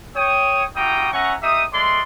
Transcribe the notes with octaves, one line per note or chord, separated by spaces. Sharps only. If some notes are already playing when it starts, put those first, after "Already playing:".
C#5 G5 D#6
G3 E4 F#4 G5 A#5 D#6
C#4 E5 F#5 G#5 A#5 C#6
D#4 G4 E5 D#6
G#3 A3 D5 C6